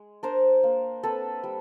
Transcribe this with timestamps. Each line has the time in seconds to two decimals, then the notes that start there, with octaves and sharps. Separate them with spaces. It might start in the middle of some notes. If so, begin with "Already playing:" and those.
Already playing: G#3
0.23 D4 A#4 C5
0.63 A#3
1.03 C4 A4 B4
1.44 G3